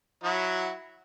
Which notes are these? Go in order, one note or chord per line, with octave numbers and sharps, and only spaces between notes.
F#3 E4 F#4